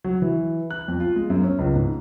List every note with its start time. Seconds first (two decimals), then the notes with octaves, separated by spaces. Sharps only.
0.04 F#3
0.22 E3
0.71 F#6
0.88 F2
1.00 F4
1.16 G#3
1.30 F#2
1.43 C#4
1.59 C#2
1.76 G#2